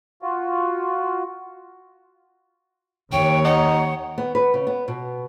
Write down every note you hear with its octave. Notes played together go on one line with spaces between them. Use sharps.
F4 F#4
D#2 C#5 G5
D#4 F#5
B3
B4
C#3
B3
B2